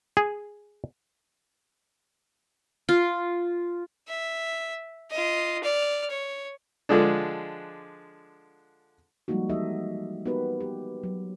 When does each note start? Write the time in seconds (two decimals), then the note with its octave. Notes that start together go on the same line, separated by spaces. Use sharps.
0.17 G#4
2.89 F4
4.08 E5
5.11 F4 D#5
5.64 D5 F6
6.10 C#5
6.89 D3 F3 G#3 D4
9.28 F3 G3 G#3 A#3 D#4 F#4
9.49 E3 D#4 G4 A4 D#5 E5
10.26 B3 D#4 F#4 G4 A#4 B4
10.61 G4
11.03 F#3